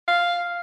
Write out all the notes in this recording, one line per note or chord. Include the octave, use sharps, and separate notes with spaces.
F5